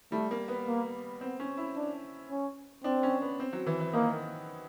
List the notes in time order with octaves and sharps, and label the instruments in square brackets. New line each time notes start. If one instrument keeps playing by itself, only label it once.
[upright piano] G3 [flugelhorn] A3
[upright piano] A#3
B3
[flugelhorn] A#3
[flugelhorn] B3 [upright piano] C4
[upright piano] C#4
E4
[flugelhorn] D4
C#4
[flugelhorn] C4 [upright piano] D4
[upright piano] C#4
B3
C4
F#3
E3
E3
[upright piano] D#3 [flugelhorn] A#3